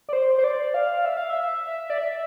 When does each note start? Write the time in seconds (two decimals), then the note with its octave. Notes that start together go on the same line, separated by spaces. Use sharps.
0.09 D5
0.13 C5
0.38 C5
0.44 D5
0.74 F5
1.05 E5
1.17 F5
1.30 E5
1.67 E5
1.90 D5
1.98 E5